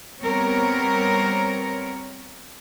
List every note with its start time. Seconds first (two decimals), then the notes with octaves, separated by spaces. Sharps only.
0.21 G3 B3 C4 A#4 C#5